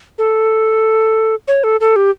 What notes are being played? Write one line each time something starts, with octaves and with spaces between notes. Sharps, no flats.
A4
C#5
A4
A4
G4